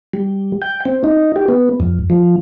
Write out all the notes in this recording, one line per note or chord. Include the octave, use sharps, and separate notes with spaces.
G3
G5
C4
D#4
G4
B3
F2
F3